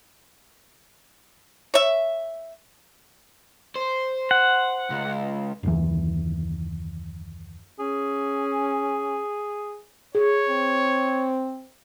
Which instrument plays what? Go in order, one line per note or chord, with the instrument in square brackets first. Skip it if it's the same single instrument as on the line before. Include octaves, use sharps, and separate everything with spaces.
[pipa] C#5 E5
[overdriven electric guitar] C5
[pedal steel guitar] F#5
[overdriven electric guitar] C#2
[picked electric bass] F#1 D#2 E3
[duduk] C#4 [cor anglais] G#4
[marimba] G#4 [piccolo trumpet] C#5
[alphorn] C4